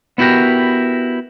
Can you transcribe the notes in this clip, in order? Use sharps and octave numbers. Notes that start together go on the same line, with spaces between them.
B3 E4 F#4 G4 A#4